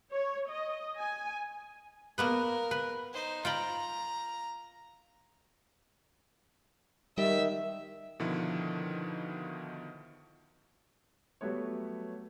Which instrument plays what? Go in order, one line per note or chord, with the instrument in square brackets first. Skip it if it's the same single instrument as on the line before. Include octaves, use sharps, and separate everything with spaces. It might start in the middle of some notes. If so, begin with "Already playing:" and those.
[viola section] C#5
D#5
G#5
[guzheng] A#3 B3 B4 [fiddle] A#4
[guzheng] B4
[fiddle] D#4 C5
[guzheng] F4 G5 B5 [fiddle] A#5
[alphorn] D#3 [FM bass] G3 [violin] E5
[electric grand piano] B2 D3 D#3 F3 E4
[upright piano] F#3 G3 A3 B3 C#5